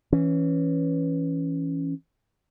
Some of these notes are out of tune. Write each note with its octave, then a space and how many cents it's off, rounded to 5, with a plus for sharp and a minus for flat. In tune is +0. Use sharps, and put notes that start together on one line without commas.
E3 +0 C#4 +0